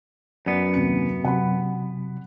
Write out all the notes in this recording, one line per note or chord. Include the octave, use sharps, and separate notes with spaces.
F#2 B3 D5
D#2 C3 C#7
C3 F#3 F#5 B5